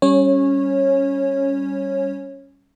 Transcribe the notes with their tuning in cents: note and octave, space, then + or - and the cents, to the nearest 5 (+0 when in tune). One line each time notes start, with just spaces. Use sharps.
G3 +0 C#4 +0 C#5 -20